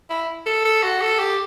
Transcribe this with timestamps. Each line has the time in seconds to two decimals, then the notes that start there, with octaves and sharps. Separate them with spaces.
0.10 E4
0.46 A4
0.65 A4
0.83 F#4
1.02 A4
1.19 G4